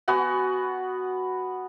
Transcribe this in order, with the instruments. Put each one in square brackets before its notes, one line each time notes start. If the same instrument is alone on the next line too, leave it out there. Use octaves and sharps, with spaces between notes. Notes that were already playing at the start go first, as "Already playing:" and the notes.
[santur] B3 F#4 F#5 G#5